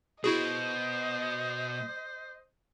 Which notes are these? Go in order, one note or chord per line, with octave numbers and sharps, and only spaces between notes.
B2 E4 F#4 G#4 C5 D#5